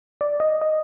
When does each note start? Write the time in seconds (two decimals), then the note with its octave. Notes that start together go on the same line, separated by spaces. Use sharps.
0.21 D5
0.40 D#5
0.62 D#5